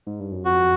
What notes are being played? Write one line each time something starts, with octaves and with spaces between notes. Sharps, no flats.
G#2
G2
F#2
F2 F#4